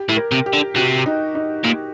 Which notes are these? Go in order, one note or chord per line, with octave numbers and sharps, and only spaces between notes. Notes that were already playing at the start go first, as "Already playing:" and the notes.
Already playing: G4
A2
A#4
C3
G4
D3
C3 F#4
D#4
D#4
A#2